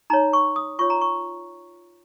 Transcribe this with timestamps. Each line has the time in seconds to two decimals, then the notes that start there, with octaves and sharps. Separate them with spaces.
0.10 D#4 C#5 A#5
0.33 C#6
0.56 D#6
0.79 F4 C#5 C#6
0.90 A#5
1.01 C#6